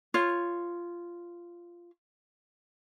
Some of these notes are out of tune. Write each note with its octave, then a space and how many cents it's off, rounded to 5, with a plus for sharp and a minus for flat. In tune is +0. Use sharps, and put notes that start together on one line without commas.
F4 -10 C#5 -10